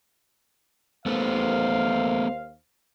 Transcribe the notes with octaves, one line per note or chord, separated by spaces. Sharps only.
D#2 A3 B3 C5 F5